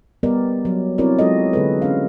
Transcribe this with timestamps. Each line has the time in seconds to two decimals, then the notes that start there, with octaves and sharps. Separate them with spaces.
0.23 G3 B3 G4 A#4 D5 D#5
0.65 F#3
0.98 C4 E4 F#4 A#4 C#5 D5
1.19 F#3 G#3 F4 A4 D#5
1.53 D3 E3 G#3 G#4 A4 B4
1.82 C#4 F5